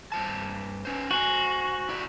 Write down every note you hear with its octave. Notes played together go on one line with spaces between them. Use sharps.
G2 C5 A5
C#4 B4 C5
F#4 C5 F#5 G#5
F2 E4 D5